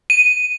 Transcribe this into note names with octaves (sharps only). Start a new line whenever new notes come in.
D#7